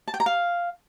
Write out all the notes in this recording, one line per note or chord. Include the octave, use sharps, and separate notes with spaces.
A5
G5
A#5
F5